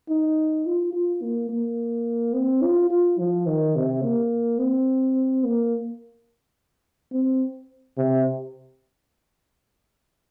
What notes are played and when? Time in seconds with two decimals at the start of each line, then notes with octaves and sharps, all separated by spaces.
0.09 D#4
0.66 F4
0.93 F4
1.22 A#3
1.49 A#3
2.34 C4
2.63 F4
2.91 F4
3.19 F3
3.46 D#3
3.76 C3
4.03 A#3
4.59 C4
5.44 A#3
7.12 C4
7.98 C3